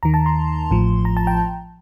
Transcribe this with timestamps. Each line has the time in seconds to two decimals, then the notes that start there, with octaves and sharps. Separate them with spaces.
0.03 D#2 D#3 A#5
0.14 A5
0.26 C6
0.71 A1 A2 F3
1.05 A#5
1.17 A5
1.27 G5